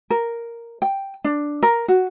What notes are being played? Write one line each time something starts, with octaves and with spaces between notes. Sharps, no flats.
A#4
G5
D4
A#4
F#4